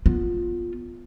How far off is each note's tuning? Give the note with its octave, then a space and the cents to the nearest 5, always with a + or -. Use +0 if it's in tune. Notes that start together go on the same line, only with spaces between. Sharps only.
B3 +0 F4 +0